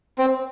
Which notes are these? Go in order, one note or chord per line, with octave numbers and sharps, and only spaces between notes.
C4